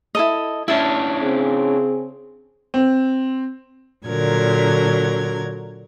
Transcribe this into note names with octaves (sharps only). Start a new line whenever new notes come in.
E4 A4 D#5
C#4 D4 E4 E5 A5
C#3 C4 G#4
C4
A#2 D3 F#3 A#4 G#6